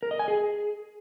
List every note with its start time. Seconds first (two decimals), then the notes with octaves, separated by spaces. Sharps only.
0.03 A#4
0.11 D#5
0.19 G#5
0.28 G#4